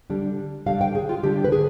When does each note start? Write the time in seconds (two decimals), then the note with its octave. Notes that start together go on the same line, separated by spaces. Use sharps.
0.10 D3 G3 D4
0.66 D3 G3 D4 F5
0.81 G5
0.95 G#4
1.09 F4
1.23 D3 G3 D4 G4
1.44 B4
1.52 G#4